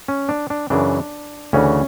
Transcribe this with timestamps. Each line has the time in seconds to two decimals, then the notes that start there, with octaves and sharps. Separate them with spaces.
0.08 C#4
0.29 D4
0.50 D4
0.70 F#2 C#3 E3 D4
1.53 D2 C#3 E3 C#4